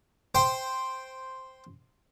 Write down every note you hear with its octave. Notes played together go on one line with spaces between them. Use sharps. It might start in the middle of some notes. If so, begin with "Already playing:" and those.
C5 G5